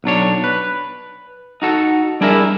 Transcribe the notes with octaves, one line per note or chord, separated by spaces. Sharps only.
B1 F#3 D4 C#5
B4
D#4 F#4 A4
G3 D4 E4 G#4 A#4 E5